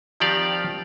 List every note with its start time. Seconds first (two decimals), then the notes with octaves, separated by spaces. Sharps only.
0.20 D#3 F3 C4 G4 D5 F5